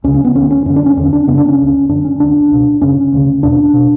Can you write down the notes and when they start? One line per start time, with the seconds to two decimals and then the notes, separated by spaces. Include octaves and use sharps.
0.04 C#2 C#4
0.07 C#3
0.14 C#4
0.24 B3
0.35 D2 D3 C#4
0.51 C#4
0.66 F#2 D3 C#4
0.76 D4
0.86 C#4
0.97 E2 D3 C#4
1.13 D4
1.27 F#2 C#3 B3
1.38 D4
1.48 C#4
1.58 C#2 C#3
1.89 F#2 D3 D4
2.05 C#4
2.20 D2 D3 D4
2.51 C#2 B2
2.81 F#2 C#3 C#4
3.12 D2 C#3
3.43 E2 B2 D4
3.73 B2